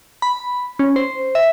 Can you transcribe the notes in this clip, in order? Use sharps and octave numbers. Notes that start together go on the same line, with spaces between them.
B5
C#4
C5
E5